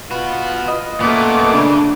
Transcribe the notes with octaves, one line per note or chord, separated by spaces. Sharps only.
F4 F#4 B4
D#5
F#2 A#2 A3 B3 D6
C#3 D4